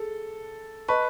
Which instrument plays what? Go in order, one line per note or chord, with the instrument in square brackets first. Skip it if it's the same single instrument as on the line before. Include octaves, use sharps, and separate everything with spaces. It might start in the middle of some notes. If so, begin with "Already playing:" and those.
Already playing: [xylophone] G#4 [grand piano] A4
[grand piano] B4 [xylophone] D#5 A5 C#6